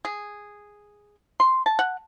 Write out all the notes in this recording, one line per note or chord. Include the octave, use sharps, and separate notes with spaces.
G#4
C6
A5
F#5